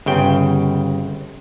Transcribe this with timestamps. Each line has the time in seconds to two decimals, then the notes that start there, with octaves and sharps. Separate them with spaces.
0.06 G1 C#3 G5